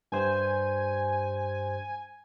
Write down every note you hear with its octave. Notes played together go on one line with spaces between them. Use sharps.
G2 C5 G#5